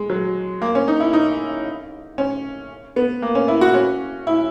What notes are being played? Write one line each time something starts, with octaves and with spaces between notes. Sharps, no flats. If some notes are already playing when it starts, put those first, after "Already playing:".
Already playing: G#3
F#3
A#3
C#4
D#4
E4
D#4
C#4
B3
A#3
C#4
E4
F#4
C#4
E4